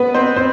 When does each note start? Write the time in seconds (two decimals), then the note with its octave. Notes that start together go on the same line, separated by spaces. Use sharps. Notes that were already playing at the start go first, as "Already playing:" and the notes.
Already playing: B3 B4
0.14 C4 C5
0.36 C4 C5